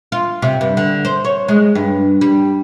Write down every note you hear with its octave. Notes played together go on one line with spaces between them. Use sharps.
F4
C3
G2
D3
C5
C#5
G#3
G2
G3